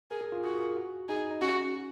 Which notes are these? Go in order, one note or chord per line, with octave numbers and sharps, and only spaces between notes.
G#4 A#4
G#4
F4
F#4 G#4
A#4
F#4
D#4 G#4
D#4
C#4 F#4